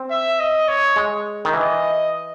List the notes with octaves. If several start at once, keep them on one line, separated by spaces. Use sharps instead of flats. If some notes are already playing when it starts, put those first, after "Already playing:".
Already playing: C4
E5
D#5
C#5
G#3
D#3
E3 D#5